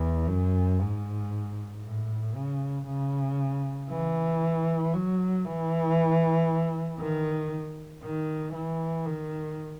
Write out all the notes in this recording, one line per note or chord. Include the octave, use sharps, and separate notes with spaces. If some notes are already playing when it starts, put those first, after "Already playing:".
Already playing: E2
F#2
G#2
A2
C#3
C#3
E3
F#3
E3
D#3
D#3
E3
D#3